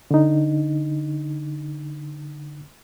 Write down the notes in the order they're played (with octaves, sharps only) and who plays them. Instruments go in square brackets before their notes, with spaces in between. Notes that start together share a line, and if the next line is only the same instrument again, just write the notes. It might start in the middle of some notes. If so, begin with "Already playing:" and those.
[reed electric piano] D3 D#4